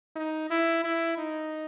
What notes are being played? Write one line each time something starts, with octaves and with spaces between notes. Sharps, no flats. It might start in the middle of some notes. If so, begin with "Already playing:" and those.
D#4
E4
E4
D#4